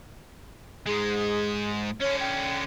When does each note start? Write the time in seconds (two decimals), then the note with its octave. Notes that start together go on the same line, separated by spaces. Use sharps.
0.86 G#2 G#3 G#4
2.01 D3 C#4 C#5
2.21 G5